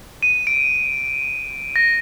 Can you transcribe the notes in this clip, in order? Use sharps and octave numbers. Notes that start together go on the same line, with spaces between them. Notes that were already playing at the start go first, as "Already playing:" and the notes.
D#7
D7
A#6